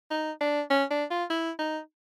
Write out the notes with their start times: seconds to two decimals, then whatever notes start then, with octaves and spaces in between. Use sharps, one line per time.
0.11 D#4
0.41 D4
0.70 C#4
0.90 D4
1.10 F4
1.30 E4
1.59 D#4